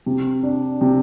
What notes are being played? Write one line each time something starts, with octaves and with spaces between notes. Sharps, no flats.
C3
D4
C3